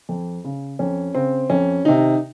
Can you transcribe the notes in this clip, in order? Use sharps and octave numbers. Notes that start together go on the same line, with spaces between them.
F2
C#3
F2 C#4
C#3 C4
F2 C#4
C3 D#3 D#4